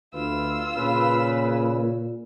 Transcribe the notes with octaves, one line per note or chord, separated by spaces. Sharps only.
D2 F4 B4 E6
A#2 C#3 B4